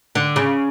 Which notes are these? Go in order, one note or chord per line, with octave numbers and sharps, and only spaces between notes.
D3
C#3